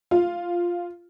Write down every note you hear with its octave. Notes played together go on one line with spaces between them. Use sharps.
F4